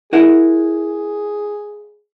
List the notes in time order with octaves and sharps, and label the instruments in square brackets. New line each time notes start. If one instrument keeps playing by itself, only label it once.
[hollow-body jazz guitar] E4 A#4 F#5 [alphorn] G#4